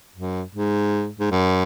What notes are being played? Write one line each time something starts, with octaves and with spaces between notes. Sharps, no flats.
F#2
G#2
G#2
F#2